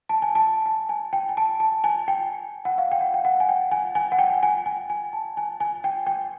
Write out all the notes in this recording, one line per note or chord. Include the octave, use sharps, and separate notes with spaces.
A5
G#5
A5
A5
G#5
G5
G#5
A5
A5
G#5
G5
F#5
F5
G5
F#5
G5
F#5
G#5
G5
G#5
G#5
F#5
G5
G#5
G#5
G#5
A5
G#5
G#5
G5
G5